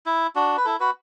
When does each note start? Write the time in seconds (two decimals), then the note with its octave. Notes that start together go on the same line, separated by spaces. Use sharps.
0.06 E4
0.36 D4 F#4
0.57 B4
0.65 E4 A4
0.80 F#4 B4